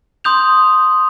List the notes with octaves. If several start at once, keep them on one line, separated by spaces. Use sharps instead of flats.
C6 D#6 G6 F7